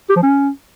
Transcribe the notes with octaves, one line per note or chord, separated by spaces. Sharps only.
G4
F3
C#4